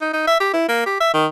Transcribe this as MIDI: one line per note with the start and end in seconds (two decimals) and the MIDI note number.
0.01 0.13 63
0.13 0.26 63
0.27 0.37 76
0.40 0.51 67
0.53 0.68 64
0.68 0.82 58
0.86 1.00 67
1.00 1.09 76
1.14 1.26 51